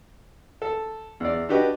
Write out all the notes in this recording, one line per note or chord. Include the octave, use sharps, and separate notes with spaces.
A4
E2 D5
D4 F#4 G4 B4 D#5